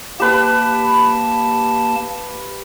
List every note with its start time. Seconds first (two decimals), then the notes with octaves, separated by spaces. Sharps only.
0.20 A#3 G4 B4 A5